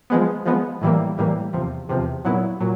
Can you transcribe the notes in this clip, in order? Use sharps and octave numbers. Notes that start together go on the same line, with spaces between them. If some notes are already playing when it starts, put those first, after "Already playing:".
F3 G#3 B3
F3 G#3 B3
A2 E3 G3 A#3
A2 E3 G3 A#3
E2 C3 F3
E2 C3 F3
A#2 F#3 B3 E4
A#2 F#3